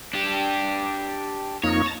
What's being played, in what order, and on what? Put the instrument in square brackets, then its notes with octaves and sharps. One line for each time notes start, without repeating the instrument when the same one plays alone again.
[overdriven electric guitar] D4 G4
[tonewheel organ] F2 A#3 D#4 [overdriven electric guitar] C#5
[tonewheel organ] A5 A#5